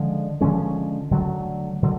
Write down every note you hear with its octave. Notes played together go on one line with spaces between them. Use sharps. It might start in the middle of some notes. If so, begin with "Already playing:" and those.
Already playing: D3 F3 G#3 C#4
D3 F3 G#3 C#4
D3 F#3 A3
D3 F#3